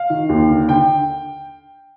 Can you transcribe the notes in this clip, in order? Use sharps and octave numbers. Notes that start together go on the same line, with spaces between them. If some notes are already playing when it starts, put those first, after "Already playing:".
Already playing: F5
D#3
D#2
D3
D3 G5